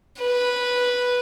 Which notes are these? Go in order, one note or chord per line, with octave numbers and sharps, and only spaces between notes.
B4